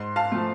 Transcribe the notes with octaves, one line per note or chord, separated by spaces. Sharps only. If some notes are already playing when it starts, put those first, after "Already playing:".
Already playing: G#2 C6
F5 A5
F3 A3